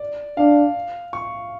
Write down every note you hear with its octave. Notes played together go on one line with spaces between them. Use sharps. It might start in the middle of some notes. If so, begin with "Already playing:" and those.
Already playing: D5
D4 F5
C#6